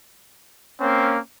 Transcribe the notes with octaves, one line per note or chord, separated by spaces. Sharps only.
A#3 C4 C#4